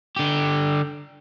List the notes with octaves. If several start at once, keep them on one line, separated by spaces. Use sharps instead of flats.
D3 G4